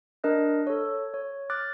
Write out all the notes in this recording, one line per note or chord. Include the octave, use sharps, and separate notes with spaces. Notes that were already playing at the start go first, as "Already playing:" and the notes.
D4 A#4 D#5 F#6
A4 C#5
C#5
D6 F6 F#6 A6